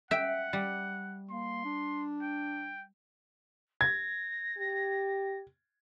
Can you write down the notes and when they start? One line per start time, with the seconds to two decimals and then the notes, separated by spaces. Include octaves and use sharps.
0.11 E5 F#5 G5
0.53 G3
1.30 A#3 C6
1.65 D4
2.22 G5
3.81 G#6 A#6
4.58 G4